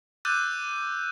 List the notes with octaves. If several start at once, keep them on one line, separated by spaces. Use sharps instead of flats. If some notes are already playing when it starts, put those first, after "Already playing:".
D6 E6 F#6 G6 A6 D#7